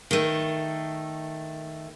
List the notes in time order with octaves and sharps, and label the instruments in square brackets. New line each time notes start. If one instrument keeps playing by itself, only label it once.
[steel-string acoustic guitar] D#3 A3